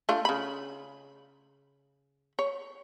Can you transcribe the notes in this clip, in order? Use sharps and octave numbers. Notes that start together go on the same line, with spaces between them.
A3 D4 F4
C#3 B5
C#5